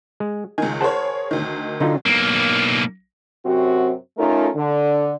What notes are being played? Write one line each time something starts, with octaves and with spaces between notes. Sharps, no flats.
G#3
C#2 D#3 G#5
G#4 A#4 C5 C#5 F#5 A5
D2 D#3
D3 F#3 D#4 F4
B1 A#3
F#2 C3 C4 F#4
A3 C#4 D#4 F4 A4 A#4
D3